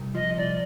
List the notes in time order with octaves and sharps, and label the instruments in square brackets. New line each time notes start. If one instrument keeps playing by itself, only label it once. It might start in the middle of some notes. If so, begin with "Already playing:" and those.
Already playing: [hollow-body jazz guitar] C2
[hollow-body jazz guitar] F3 [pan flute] D#5
[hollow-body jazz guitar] C2 [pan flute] D5